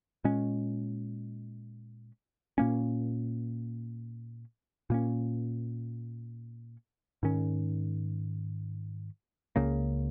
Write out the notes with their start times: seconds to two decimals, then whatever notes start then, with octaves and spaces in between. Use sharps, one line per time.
0.24 A#2 G#3 C#4
2.58 A#2 A#3 C#4
4.90 A#2 A#3 C#4
7.23 G#2 D#3 C#4
9.56 C#2 C#3 A#3